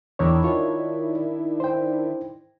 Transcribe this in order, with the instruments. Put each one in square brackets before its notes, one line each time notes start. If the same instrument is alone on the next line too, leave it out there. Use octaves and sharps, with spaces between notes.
[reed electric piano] E2 C#5 [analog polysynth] D#3 D4 E4
[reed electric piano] F4 C#5
C5 G5